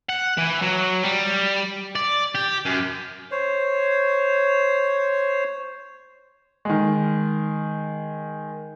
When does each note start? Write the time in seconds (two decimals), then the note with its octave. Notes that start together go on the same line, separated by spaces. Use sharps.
0.09 F#5
0.38 E3
0.62 F#3
1.05 G3
1.96 D5
2.35 G4
2.65 F#2
3.31 C5 C#5
6.65 D#3 G#3